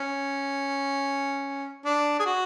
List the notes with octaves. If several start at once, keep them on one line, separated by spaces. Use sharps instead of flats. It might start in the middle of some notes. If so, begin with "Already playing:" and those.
Already playing: C#4
D4
G#4
F#4